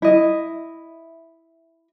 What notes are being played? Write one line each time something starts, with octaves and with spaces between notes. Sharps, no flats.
E4 D#5 E5